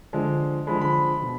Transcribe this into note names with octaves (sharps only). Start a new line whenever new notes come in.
D3 F3 G#3
D3 F3 G#3 B5
B5
B2